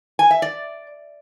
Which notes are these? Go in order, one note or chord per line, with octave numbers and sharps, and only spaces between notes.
G#5
E5
D5